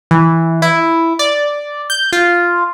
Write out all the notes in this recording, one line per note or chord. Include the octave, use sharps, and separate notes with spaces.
E3
E4
D5
G6
F4